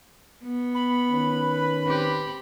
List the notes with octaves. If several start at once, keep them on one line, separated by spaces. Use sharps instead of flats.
B3
B5
D#3 C#4 B4
C4 G4